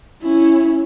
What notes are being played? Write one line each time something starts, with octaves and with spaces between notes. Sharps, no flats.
C#4 E4